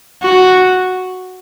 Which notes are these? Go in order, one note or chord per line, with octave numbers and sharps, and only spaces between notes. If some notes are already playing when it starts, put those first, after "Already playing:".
F#4